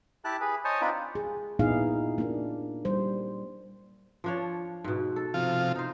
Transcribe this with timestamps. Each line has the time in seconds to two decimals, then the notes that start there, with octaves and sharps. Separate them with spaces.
0.25 E4 G4 A5 F#6
0.41 G#4 B4
0.65 C5 C#5 D#5 G#5 A5
0.81 C4 D4 D#4 F4 B4 G5
1.15 G#4
1.59 A#2 B3 D#4 E4 G#4 F5
2.18 A#3 D4
2.85 G3 C5
4.24 F3 D4 C#5
4.84 G#2 B2
5.16 A4
5.34 C3 F3 F4
5.76 D#4 C5